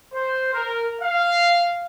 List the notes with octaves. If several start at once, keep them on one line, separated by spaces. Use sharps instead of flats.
C5
A#4
F5